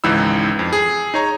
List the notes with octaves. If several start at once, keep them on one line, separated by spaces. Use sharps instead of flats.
G#1 C#2 E3 D#4 B5 E6
F2
G#4
D#4 C#5 A#5